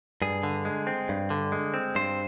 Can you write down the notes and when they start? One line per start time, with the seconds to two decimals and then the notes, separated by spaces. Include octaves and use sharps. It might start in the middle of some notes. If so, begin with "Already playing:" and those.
0.22 G2 G#4
0.43 D3
0.65 G#3
0.87 C4
1.09 G2
1.30 D3
1.52 G#3
1.74 C4
1.95 G2 C5